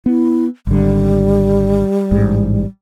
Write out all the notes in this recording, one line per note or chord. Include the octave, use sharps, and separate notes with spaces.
B3 E4
G#1 D3 G3
A1 G#2